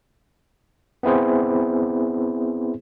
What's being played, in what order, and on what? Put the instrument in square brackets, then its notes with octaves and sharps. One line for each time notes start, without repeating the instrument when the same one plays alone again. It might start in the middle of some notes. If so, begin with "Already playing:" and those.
[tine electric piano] B3 C4 E4 G#4 C5